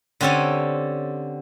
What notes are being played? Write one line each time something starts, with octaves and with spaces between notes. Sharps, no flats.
D3 C4 C#4 G4 A4 G#5